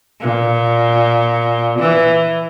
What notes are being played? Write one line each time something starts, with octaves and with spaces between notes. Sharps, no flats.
A#2
E3